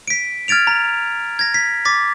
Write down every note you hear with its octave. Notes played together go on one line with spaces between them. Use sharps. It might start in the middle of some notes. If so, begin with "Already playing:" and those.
B6 D7
F6 G#6 A6 D7 F7
A#5
G#6 A#6
B6
D6 A6 B6